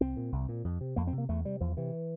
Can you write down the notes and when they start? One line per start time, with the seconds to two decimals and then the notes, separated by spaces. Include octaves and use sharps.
0.01 C2 C4
0.17 A#2
0.32 C2
0.49 A#2
0.64 F2
0.81 C3
0.96 F2 A#3
1.07 C4
1.13 C3
1.18 A#3
1.29 E2 A3
1.45 C3 G3
1.61 E2 F3
1.77 C3 E3